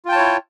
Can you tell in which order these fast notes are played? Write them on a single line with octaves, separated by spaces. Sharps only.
F4 G5 A5 C#5 E4